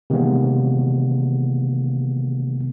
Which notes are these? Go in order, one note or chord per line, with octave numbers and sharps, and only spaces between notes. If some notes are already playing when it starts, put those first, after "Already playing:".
C3 D#3 E3 G#3 A#3 B3